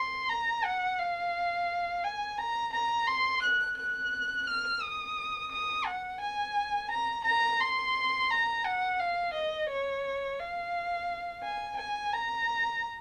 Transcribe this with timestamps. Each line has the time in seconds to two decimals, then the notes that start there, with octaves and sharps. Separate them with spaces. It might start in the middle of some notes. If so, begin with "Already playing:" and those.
Already playing: C6
0.29 A#5
0.64 F#5
0.99 F5
2.04 G#5
2.38 A#5
2.73 A#5
3.07 C6
3.43 F#6
3.78 F#6
4.47 F6
4.82 D#6
5.52 D#6
5.86 F#5
6.21 G#5
6.91 A#5
7.25 A#5
7.60 C6
8.30 A#5
8.65 F#5
8.99 F5
9.34 D#5
9.69 C#5
10.39 F5
11.43 G#5
11.78 G#5
12.13 A#5